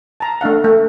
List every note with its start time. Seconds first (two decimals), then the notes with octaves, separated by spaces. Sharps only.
0.20 A5 A#5
0.41 A3 D4 F5 F#5
0.64 A3